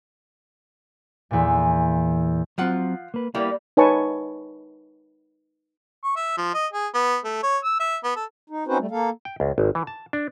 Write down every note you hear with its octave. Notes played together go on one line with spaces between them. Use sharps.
E2 A#2
F3 F#3 C4 F4 F#5
A#3 B4
G3 A#3 B3 E4
D#4 B4 C#5 G#5 A5 C#6
C#6
E5
F3
D#5
G#4
B3
A3
C#5
E6
E5
B3
A4
D#4
C4 C#4 D#4 F#4 B4 C5
G3 A3
A#3 A4 F5
G5
C#2
G#1
E3
A5
D4